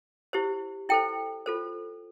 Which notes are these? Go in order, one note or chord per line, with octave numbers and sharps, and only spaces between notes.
E4 G4 C5
E4 A4 C5 G5
F4 A4 C5